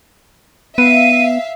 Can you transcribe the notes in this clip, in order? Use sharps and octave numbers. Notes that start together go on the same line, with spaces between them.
B3 E5 F5 D#7